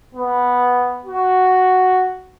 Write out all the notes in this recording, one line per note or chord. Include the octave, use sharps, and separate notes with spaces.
B3
F#4